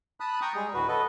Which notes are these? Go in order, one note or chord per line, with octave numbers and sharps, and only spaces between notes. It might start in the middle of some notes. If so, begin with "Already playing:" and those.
A5 B5 D#6 F#6
G5 A#5 C#6 D#6
G3 G#3 G#4
D2 A2 F#4 B4
A4 B4 D#5